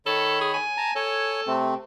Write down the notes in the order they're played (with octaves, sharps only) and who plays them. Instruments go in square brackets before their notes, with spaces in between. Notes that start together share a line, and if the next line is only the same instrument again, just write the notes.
[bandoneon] D#3 C#5 B5 [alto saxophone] A4
[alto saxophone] G#4
G#5
[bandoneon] A5 A#5
[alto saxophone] A4 [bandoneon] C#5 G#5
[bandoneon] C3 A3 C4